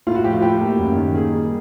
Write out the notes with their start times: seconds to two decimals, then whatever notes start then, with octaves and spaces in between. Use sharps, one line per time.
0.07 A2 F4
0.15 F#4
0.24 F3 G4
0.33 F4
0.42 A2 G4
0.60 A#3
0.79 F#2
0.96 D#3
1.14 A#3 G#4
1.33 G3